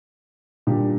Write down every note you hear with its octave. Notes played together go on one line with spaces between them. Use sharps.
A#2 G3 D4 G4